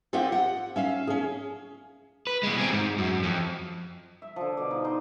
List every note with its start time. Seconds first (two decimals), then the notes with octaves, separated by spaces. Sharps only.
0.13 C4 F4 G4 D#5 E5 F#5
0.32 F#5
0.76 C#4 E5 F5
1.07 C#4 G#4
2.27 B4
2.43 B2 G#3
2.58 C4 G#4
2.73 G#2
2.98 F#2
3.23 F2
4.22 E5
4.36 D3 F3
4.57 B2 D5
4.71 D#4
4.84 D#4 C5